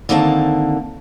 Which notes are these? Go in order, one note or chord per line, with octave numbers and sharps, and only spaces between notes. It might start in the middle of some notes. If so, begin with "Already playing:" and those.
D3 D#3 A#3 C4 F5 A5